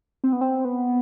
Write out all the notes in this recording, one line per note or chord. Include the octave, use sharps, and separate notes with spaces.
C4
B3
C4
B3